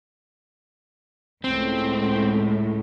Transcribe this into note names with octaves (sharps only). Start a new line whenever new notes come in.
C#2 A2 C4